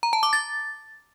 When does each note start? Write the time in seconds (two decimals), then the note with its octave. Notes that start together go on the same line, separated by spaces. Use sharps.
0.03 A#5
0.13 A5
0.23 D6
0.33 A6